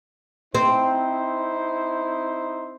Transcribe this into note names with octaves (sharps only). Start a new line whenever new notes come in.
C4 D#4 E4 C5